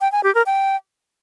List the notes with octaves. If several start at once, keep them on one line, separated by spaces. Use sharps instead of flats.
G5
G#5
G4
A#4
G5